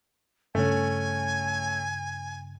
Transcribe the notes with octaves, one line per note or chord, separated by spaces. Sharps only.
G2 C#3 A3 C#4 G#5